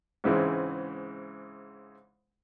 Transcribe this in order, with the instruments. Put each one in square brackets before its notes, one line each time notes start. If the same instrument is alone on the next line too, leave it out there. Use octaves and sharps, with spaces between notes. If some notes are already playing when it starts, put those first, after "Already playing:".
[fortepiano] G#2 C#3 E3 G#3 C4